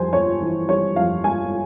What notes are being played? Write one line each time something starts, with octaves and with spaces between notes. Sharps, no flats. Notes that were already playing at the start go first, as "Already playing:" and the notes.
Already playing: F2 G3 C5 G#5
G1 C#5
E3
G3 C#5
F2 F5
G1 G#5